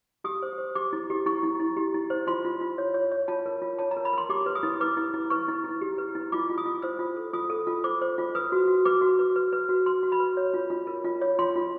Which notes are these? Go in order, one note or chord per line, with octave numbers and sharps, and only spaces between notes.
G4 D#6
C5
C5
G4 D6
E4
G4
E4 C#6
E4
E4
G4
E4
C5
F4 C6
F4
F4
C#5
C#5
C#5
F4 A5
A#4
F4
C#5 A5
A#5
A#4
B5
A#4 C6
G4 D6
B4
D#6
E4
B4 D6
E4
E4
B4 C#6
E4
E4
G4
B4
E4
F4 D6
F4
D#6
F4
C5 E6
F4
A4
F4 D#6
A4
F4
C5 D6
C5
F4
B4 D#6
F#4
F#4
B4 D6
F#4
B4
B4
B4
F#4
B4 C6
F#4
B5
B4
C#5
F4
F4
A#4
F4
C#5
F4 C6
F4